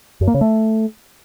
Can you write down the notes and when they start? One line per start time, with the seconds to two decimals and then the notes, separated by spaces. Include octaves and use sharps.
0.21 F#2
0.28 A#3
0.34 C#3
0.41 A3